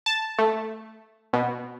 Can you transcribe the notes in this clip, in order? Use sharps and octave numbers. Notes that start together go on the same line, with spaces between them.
A5
A3
B2